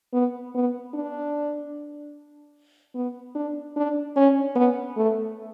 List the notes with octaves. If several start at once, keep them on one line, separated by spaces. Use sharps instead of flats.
B3
B3
D4
B3
D4
D4
C#4
B3
A3